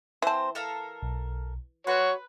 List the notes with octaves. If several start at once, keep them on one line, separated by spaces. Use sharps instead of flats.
E3 C4 C5 A5
A4 A#4 F5
B1
F#4 B4 C#5 C6